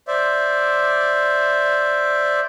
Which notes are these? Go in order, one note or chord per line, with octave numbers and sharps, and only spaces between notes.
C5 D5 E5